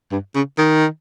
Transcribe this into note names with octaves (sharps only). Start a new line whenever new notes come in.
G2
C#3
D#3